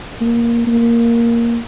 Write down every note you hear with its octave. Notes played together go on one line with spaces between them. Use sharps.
A#3
A#3